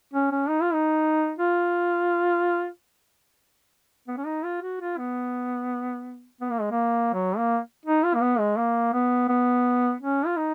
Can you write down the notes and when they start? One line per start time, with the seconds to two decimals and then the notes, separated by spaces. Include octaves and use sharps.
0.13 C#4
0.32 C#4
0.49 D#4
0.62 F4
0.73 D#4
1.39 F4
4.07 B3
4.17 C#4
4.26 D#4
4.44 F4
4.62 F#4
4.80 F4
4.98 B3
6.41 B3
6.51 A#3
6.61 G#3
6.71 A#3
7.13 F#3
7.37 A#3
7.86 D#4
8.04 F4
8.15 A#3
8.21 B3
8.39 G#3
8.57 A#3
8.93 B3
9.29 B3
10.01 C#4
10.26 F4
10.37 D#4